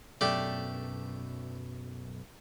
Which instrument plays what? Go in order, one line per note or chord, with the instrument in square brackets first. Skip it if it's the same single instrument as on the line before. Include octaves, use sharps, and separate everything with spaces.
[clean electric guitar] B1 F#2 B2 [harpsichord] A3 D4 G4